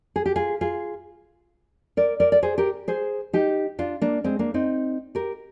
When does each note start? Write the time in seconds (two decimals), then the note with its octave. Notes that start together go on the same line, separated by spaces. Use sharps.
0.16 G#4
0.26 G4
0.36 F4 G#4
0.61 F4 G#4
1.97 A#4 D5
2.20 A#4 D5
2.32 D5
2.43 G#4 C5
2.58 G4 A#4
2.88 G#4 C5
3.33 D#4 G4
3.79 D4 F4
4.01 A#3 D4
4.24 G#3 C4
4.39 A#3 D4
4.54 C4 D#4
5.15 G4 A#4